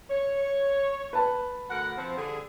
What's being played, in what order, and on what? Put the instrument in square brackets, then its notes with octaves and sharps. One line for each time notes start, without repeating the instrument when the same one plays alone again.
[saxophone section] C#5
[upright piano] B4 A5
[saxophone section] D2 A#4 F#5
F3 C4
D3 G3 G#4